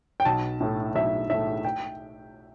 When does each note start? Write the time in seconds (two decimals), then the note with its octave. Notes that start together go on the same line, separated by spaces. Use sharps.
0.20 G5
0.25 B1 A5
0.60 A2 A3
0.95 B1 E5
1.30 A2 A3 E5
1.65 G5